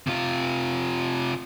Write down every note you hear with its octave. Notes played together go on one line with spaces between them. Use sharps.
C3 F4